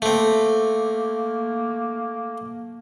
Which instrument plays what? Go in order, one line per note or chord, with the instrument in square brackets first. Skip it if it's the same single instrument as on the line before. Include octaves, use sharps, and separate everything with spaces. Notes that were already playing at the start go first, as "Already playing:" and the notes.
[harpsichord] A3 C4 [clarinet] A#3